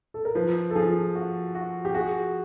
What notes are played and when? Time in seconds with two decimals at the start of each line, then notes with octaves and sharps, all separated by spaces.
0.14 A4
0.25 A#4
0.35 F3 B4
0.70 A4
0.75 F3 G#4
1.15 F#4
1.55 F#4
1.85 G4
1.94 F#4 G#4